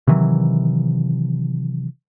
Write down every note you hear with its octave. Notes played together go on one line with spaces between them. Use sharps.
C3 D#3 E3 F#3